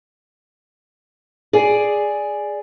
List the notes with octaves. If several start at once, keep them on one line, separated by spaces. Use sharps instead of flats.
G#4 D5